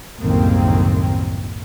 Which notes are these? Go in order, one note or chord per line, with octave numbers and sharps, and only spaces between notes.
F#1 C2 A2 D#3 A#3 C4